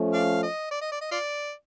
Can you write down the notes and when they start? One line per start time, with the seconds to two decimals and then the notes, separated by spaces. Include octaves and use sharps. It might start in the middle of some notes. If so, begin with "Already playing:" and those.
Already playing: F3 A3 C#4
0.13 D5 F5
0.42 D#5
0.71 D5
0.81 D#5
0.91 D5
1.01 D#5
1.11 F4 D5